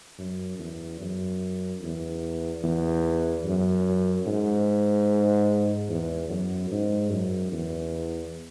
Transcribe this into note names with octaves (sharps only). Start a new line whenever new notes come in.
F#2
E2
F#2
E2
E2
F#2
G#2
E2
F#2
G#2
F#2
E2